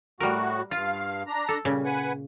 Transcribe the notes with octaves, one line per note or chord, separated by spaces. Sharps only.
A2 G3 F#4 A#4
G2 F4 F5
D4 A#5
A4
A#2 C#3 G3
B4 F#5 G#5